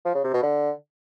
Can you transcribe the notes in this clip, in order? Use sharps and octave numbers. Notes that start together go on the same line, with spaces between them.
F3
C#3
C3
B2
D3